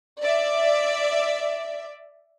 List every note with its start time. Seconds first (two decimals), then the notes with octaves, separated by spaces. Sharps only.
0.20 D5 E5